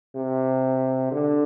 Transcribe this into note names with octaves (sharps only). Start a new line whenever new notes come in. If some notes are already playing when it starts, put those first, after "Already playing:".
C3
D3